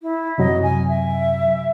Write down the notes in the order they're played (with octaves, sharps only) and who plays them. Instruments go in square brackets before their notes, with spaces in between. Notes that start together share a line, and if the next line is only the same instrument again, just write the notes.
[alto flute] E4
[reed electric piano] F#2 C3 F#3 [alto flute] D#5
[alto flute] G#5
E5